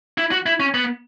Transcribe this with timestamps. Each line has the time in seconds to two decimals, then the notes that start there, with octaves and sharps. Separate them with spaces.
0.18 E4
0.31 F#4
0.46 E4
0.60 C#4
0.74 B3